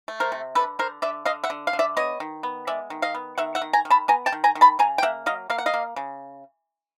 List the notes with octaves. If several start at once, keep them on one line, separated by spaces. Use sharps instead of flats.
A3
A#4 C5
C3
D3 A4 B4
D3 A#4 C5
D3 D5 E5
D3 D#5 F5
E5 F#5
D3
F5
D3
D5 E5
B3 C#5 D#5
D#3
B3
G#3 D5 E5
D#3
D#5 F5
B3
D#3 E5 F#5
E5 F#5
D#3
G#5 A#5
D#3
A5 B5
B3 G#5 A#5
G5 A5
D#3
G#5 A#5
D#3
A5 B5
C#3 G#5 A#5
G5
A#3 E5 F#5
F#3 D#5 F5
A#3 F5
F#5
D#5 F5
A#3
C#3